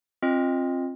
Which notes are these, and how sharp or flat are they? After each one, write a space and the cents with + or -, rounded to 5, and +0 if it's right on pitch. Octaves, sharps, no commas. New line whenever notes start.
C4 +25 F4 +0 D#5 +0